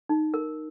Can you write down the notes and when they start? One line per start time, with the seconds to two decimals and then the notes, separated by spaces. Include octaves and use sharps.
0.09 D#4
0.34 A#4